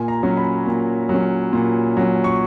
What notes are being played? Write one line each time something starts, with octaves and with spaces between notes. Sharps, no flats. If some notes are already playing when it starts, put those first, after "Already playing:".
Already playing: A#2 G#5
A#5
F#3 C#4
B5
A#2
F#3 C#4
A#2
F#3 C#4
C#6